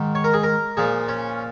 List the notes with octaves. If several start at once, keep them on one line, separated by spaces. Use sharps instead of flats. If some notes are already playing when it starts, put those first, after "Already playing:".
Already playing: G#2 D#3
C#5
A#4
G#4
A#4
A#2 F3 G#4
C#4